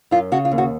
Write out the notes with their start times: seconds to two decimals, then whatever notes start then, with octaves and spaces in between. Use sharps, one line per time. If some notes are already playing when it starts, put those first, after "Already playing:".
0.11 F#2 F4
0.32 C#3 F#4
0.45 F4
0.52 D#2
0.58 F#4